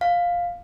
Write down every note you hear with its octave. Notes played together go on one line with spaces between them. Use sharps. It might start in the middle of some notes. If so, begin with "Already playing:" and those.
F5